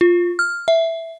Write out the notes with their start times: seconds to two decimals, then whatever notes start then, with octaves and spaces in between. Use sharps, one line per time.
0.01 F4
0.39 F6
0.68 E5